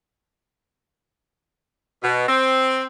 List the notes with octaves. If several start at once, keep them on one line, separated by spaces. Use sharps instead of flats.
B2
C4